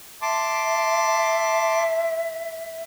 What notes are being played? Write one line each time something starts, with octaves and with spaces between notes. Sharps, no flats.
E5 A5 C6 D6